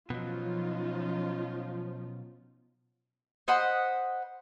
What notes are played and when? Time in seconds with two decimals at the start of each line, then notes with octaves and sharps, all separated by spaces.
0.10 B2 F3 F#3 C#4 D#4 F4
3.48 C5 D#5 F#5 B5